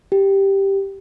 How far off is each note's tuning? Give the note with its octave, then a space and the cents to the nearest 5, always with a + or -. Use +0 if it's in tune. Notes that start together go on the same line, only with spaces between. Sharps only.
G4 +0